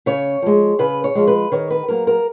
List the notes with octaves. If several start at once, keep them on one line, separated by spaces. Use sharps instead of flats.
C#3 C#5
F3 G#3
C#3 B4
C#5
F3 G#3
B4
D#3 C#5
B4
F#3 A#3 A#4
A#4